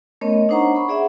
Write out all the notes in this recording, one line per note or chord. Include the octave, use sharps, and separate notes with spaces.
A3 B3 C#4 A#4 C#5 D#5
D4 D#4 C5 F#5 A#5 C#6
B5 C#6
G#4 D5 E5 F#5